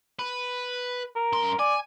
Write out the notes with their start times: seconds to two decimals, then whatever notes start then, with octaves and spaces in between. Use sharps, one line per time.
0.19 B4
1.16 A#4
1.33 F#2 C6
1.59 D5 G#5